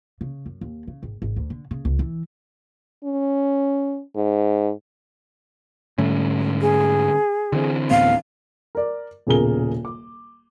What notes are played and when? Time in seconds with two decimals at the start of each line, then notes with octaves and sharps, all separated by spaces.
0.21 C#3
0.46 F#2
0.61 D#2
0.87 C#3
1.03 G#1
1.22 G#1
1.36 D2
1.50 D3
1.71 C#3
1.85 C#2
1.99 E3
3.04 C#4
4.16 G#2
5.98 G#2 D3 G3 A3 C#4
6.61 G#4
7.52 D3 E3 C4
7.91 D2 A2 B3 F5
8.75 A#4 D5
9.27 D#1 B1 C#3 G#4 A#4 G7
9.85 D6